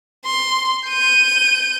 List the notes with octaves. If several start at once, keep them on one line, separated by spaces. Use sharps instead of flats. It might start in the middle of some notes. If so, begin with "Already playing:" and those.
C6
G6 D#7